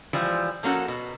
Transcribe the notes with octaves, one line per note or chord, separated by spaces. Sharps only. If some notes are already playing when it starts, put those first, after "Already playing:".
E3 F3 G3 G#3
F3 A#3 C#4 F#4 A4
B2